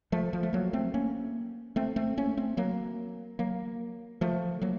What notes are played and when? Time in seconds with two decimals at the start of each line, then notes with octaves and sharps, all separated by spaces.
0.12 F3 A3
0.33 F3 A3
0.43 A3
0.53 F#3 A#3
0.73 A3 C4
0.94 A#3 C#4
1.76 A3 C4
1.96 A3 C4
2.17 A#3 C#4
2.37 A3 C4
2.57 F#3 A#3
3.39 F#3 A#3
4.21 F3 A3
4.61 F#3 A#3